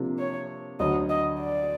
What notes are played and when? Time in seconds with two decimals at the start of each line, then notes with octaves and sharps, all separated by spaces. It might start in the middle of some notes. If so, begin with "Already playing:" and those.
Already playing: C3 F3 A#3 D4
0.19 C#5
0.80 D2 D3 F#3 D#5
1.09 D#5
1.40 D5